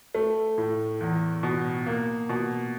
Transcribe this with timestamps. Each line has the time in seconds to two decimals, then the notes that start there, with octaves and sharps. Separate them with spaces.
0.15 A3
0.58 A2
1.01 E2
1.43 B2
1.86 A#3
2.29 B2